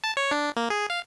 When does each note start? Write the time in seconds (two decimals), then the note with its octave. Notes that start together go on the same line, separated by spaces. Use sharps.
0.04 A5
0.17 C#5
0.31 D4
0.57 A#3
0.70 G#4
0.90 F5